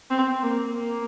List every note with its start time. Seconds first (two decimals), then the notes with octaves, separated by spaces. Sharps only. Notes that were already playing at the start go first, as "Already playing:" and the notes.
0.10 C4
0.42 A#3
0.75 A#3